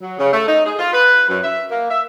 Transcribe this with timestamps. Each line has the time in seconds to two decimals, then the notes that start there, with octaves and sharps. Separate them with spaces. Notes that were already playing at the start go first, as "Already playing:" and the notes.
0.01 F#3
0.18 C#3
0.32 A3
0.47 D#4
0.64 G#4
0.78 F4
0.93 B4
1.29 F#2
1.43 E5
1.70 A#3
1.89 E5